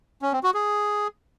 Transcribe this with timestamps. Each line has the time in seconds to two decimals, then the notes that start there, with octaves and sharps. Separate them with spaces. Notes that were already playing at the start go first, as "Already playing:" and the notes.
0.22 C#4
0.33 C4
0.43 F#4
0.54 G#4